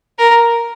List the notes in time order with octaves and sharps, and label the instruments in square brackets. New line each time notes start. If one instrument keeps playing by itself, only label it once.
[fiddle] A#4